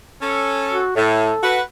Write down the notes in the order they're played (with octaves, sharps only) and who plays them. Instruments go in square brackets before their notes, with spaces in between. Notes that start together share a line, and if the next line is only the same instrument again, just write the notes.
[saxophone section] C#4 A4
[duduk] F#4
[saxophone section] A2 [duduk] A4
[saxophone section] F#4 B4